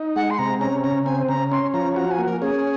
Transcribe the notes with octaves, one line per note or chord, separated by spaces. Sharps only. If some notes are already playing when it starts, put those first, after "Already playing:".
Already playing: D#4
G#3 F#5
C6
C3 A#5
C#4 A#5
C#3 A#5
C4 G#5
C#3 A#5
C#4 C6
F3 A#5
F#4 A#5
G#5
A#3
A#4
C#4 G#4